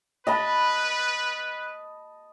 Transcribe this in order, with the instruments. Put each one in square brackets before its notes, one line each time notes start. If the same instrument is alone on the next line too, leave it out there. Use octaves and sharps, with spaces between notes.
[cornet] B4 [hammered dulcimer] D#5 A5 B5